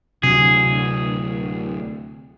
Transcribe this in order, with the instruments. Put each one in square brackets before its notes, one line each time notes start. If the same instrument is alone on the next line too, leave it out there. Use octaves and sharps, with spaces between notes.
[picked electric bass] D2 F#3 [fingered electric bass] C3 [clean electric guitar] G#4